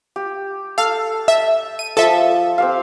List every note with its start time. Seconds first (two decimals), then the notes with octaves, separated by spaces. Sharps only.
0.16 G4
0.78 A4 F5
1.28 E5
1.79 D#7
1.97 F3 A4 E5
2.58 C4 G4 F5